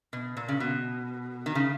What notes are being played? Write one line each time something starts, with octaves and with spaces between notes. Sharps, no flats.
B2
A#2
C#3
B2
D#3
C#3